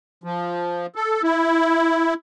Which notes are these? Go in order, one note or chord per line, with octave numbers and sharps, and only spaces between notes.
F3
A4
E4